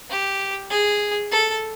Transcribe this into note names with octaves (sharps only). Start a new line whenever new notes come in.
G4
G#4
A4